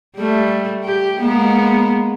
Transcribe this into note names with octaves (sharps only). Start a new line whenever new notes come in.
G3 A3
G4
G#3 A#3 B3